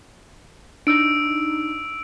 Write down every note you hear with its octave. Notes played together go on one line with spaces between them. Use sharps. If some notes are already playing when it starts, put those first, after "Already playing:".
D4 D#4 E6 D7